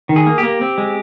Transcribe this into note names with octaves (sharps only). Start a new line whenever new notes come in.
D#3
G#4
A#3
G4
A#3
C4
G#3